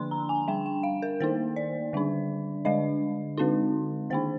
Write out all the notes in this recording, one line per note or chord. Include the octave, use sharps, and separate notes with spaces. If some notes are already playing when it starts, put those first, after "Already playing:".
Already playing: D3 F3 A#3 D4 C6
A#5
G#5
G3 D4 G5
G5
F5
A#4
D#3 A#3 D#4 C5
D5
D3 G3 D4
D3 G#3 D4 D#5
D3 G#3 C4 D#4
D#3 A#3 D4 C5